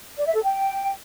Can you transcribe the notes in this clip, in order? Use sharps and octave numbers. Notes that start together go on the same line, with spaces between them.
D5
E5
A4
G5